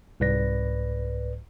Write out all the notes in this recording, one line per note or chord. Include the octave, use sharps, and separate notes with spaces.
C2 G#2 B4 D5 A#6